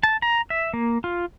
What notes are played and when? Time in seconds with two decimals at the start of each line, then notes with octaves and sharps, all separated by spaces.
0.03 A5
0.22 A#5
0.50 E5
0.74 A#3
1.04 F4